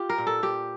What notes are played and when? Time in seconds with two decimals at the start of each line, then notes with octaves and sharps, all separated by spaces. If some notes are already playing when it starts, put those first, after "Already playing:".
Already playing: F4 G4
0.09 A#4
0.18 A#2
0.27 A4
0.42 A#2 G4